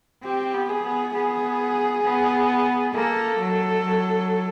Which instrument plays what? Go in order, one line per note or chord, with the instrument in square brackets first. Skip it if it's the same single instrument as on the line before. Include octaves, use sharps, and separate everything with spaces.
[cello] C4 [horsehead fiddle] G4
[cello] B3
[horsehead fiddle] G#4
[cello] B3
[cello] B3 [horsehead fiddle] G#4
[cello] B3
[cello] A#3 [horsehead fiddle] A4
[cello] F#3
F#3